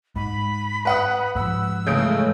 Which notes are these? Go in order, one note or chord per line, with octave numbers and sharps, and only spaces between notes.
G#2 B5
B4 F#5 D#6
G#2 F3 E6
C#3 E3 G#3 A3 G6 D7